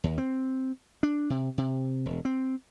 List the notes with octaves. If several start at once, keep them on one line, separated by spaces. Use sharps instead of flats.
D#2
C4
D4
C3
C3
E1
C4